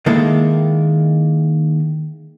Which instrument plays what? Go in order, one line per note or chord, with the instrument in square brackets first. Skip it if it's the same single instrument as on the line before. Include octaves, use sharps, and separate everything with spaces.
[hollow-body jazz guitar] D#3 G#3 A#3 E4 A4